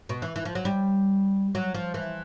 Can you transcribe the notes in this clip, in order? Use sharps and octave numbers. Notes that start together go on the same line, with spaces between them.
B2
E3
E3
F3
F#3
G3
F#3
F3
E3